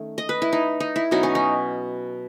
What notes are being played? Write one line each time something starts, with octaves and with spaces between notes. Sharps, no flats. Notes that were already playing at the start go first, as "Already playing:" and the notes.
Already playing: D#3 A3 C#4
D#5
B4
E4
D#4
D#4
E4
B2 F#3 C#4 D#4
C#4
D#4